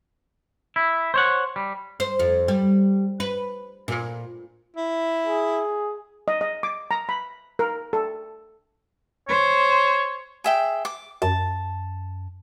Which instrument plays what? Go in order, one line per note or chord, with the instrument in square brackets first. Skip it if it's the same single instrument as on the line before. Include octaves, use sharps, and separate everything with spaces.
[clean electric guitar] E4
C5 C#5 F#5
G3
[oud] C5
F2
G3
B4
A#2
[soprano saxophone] E4
[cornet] G#4
[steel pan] D#5
D#5
D6
A#5
B5
A#4
A4
[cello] C5 [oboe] C#5
[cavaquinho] G#4 E5 G5
D6
[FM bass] F#2 [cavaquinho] A5